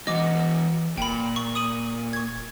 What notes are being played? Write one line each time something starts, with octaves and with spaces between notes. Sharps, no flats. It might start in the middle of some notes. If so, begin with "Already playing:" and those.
E2 E3 F#4 D#5 D6
D#1 A#2 G5 B5
C#6
D#6 D#7 F#7
C#6 G#6